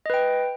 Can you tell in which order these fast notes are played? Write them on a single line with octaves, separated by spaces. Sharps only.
D#5 B4 G5